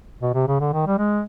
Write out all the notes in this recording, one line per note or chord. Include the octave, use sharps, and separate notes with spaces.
B2
C3
C#3
D3
D#3
G3
G#3